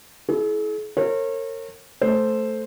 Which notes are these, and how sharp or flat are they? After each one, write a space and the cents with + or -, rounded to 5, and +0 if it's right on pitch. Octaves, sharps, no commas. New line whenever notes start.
E4 +0 G#4 +45
A#4 -35 C#5 -35
A3 +0 C5 +0